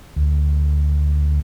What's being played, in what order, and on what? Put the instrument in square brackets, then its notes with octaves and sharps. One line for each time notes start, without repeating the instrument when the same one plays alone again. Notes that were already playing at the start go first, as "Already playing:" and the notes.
[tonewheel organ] D2